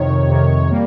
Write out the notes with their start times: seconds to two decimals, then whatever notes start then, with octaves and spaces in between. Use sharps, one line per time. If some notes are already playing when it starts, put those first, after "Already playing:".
Already playing: F2 C3 D#3 C#5
0.27 F2 C3 D#3
0.70 G3 A#3